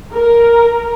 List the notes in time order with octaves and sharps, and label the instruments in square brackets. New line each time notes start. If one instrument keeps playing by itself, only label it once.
[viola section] A#4